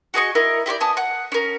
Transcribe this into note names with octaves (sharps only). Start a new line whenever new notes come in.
F#4 G#4 D#5 C#6
E4 A#4 D#5
E4 G4 C#5 D5
B3 G#5 A5 D#6
F#5
C#4 A#4